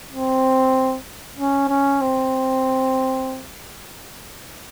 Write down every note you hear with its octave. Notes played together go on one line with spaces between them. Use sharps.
C4
C#4
C#4
C4